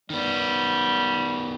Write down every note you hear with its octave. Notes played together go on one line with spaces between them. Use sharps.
D#3 G3 B3